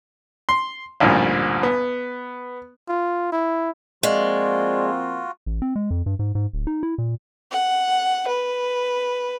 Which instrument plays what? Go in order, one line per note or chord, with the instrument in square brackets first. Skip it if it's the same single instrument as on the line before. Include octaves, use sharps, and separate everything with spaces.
[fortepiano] C6
A1 D2 G2 A#2 F3
B3
[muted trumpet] F4
E4
[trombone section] F3 A#3 C4 [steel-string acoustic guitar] G#3 [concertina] F4 F#4 [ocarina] D5
[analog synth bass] A1
C4
G#3
F2
G2
G#2
G#2
D1
D#4
E4
A#2
[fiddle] F#5
B4